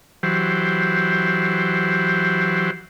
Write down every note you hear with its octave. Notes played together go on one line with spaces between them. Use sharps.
E3 F#3 G4 C5